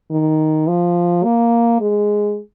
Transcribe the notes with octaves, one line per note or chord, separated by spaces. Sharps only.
D#3
F3
A#3
G#3